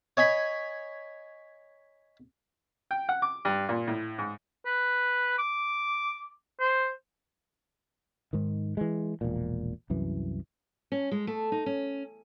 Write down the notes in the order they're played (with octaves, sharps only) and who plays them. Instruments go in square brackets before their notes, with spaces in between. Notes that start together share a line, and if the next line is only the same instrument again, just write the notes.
[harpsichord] C#5 D#5 G#5 B5
[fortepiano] G5
F#5
D6
G2
A#2
A2
G#2
[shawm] B4
D6
C5
[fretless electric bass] G#2 D#3
E3 G#3
E1 A#1 A#2
C2 F#2 E3
[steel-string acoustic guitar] C#4
G#3
A3
D#4
C#4